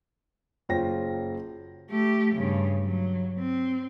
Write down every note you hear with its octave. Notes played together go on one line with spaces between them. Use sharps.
F#1 F4 C5 C#5 G5 A#6
A3 G4
G2 C#3
F#3
C4